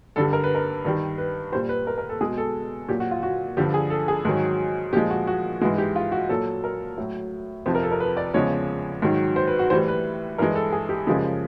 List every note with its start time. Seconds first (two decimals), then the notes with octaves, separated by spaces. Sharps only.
0.16 G2 D3 G3 A4
0.33 A#4
0.44 B4
0.55 A#4
0.85 G2 D#3 G3
1.18 B4
1.52 A#2 G3 C5
1.69 B4
1.87 A#4
1.98 A#4
2.09 A4
2.21 B2 G#3 G#4
2.38 A4
2.89 A#2 F#3 G4
3.00 F#4
3.11 F4
3.23 F#4
3.57 G2 D3 F3 G4
3.74 G#4
3.90 A4
4.08 G#4
4.25 G#2 D#3 F#3
4.93 A#2 F3 G#3 G4
5.11 F#4
5.27 F#4
5.61 G#2 E3 G#3 F#4
5.78 G4
5.96 F4
6.12 F#4
6.29 A#2 F#3 A4
6.64 A#4
6.97 A2 F#3
7.66 F2 C3 F3 C5
7.75 A#4
7.83 A4
7.92 A#4
8.00 B4
8.17 D5
8.34 E2 C#3 F3 G#3 C#5
9.02 G#2 D#3 F#3
9.36 C5
9.48 B4
9.59 F#4
9.70 A2 E3 G3 C5
9.88 B4
10.38 G2 E3 G#3 A#4
10.56 A4
10.72 G#4
10.89 G4
11.07 F#2 C#3 F3 G#3 G4